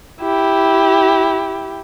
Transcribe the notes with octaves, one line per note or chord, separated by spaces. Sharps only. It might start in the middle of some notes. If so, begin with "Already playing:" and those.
E4 G4